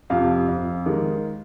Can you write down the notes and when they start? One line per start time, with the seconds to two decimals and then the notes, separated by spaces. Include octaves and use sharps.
0.10 F2 C3 F3 F5
0.48 F2
0.86 D#3 G#3